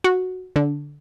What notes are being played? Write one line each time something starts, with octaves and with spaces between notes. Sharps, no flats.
F#4
D3